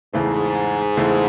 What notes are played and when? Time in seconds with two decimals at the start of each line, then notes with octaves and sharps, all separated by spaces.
0.13 E2 G#2 C#3 E3 A3 C4
0.97 E2 C#3 E3 A3 C4